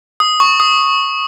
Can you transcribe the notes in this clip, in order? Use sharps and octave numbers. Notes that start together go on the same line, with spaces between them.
D#6
C#6
D#6